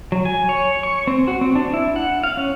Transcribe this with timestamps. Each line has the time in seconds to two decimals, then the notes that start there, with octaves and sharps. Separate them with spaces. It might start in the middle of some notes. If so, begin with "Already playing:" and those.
0.12 F#3
0.25 G#5
0.49 C#5
0.83 C#6
1.07 C4
1.28 F#4
1.41 C4
1.55 D4
1.74 E4
1.96 F#5
2.24 F5
2.37 C#4